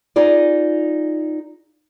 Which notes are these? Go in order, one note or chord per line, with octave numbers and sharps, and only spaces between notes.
D#4 F4 G#4 D5